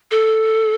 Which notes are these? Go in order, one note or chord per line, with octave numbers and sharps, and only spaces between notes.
A4